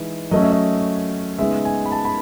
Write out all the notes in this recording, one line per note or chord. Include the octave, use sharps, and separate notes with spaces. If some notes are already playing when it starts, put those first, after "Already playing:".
Already playing: E3 G#3 D#4
F#3 A3 C#4 D#5
E5
D#5
C#3 G#3 B3 D#4 E5
G#5
B5
A5
B5